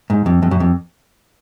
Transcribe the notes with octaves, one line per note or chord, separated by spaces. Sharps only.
G#2
F2
F2
F#2
F2